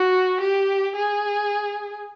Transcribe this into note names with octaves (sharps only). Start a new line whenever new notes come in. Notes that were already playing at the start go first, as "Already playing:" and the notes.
Already playing: F#4
G4
G#4